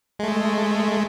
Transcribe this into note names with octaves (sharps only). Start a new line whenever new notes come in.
G#3 A3